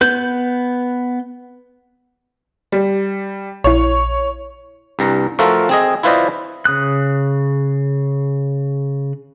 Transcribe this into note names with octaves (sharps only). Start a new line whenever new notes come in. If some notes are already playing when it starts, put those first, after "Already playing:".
B3 B4 G6
G3
A#1 E4 C#5
C2 G2 A#5
F3 A3 F4 F#4 A4 A#4
C4 G#4 D#5
E4 F4 B4 C5 D5 D#5
C#3 D#6 F#6